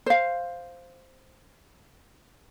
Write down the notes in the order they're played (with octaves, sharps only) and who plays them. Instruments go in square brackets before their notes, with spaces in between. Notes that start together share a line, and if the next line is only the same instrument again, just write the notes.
[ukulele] C5 F5